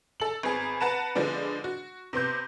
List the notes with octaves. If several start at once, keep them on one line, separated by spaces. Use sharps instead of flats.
A4 F#7
G#1 B3 G#4
B4 F#5 A5 A#5 E7
D3 F3 G#3 B3 D4
F#4
C3 B3 C6 G6